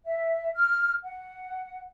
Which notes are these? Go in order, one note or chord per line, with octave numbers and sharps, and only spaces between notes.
E5
F6
F#5